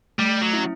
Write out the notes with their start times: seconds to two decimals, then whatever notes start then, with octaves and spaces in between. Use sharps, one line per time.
0.18 G3 A3
0.41 F#3
0.53 C#4 E4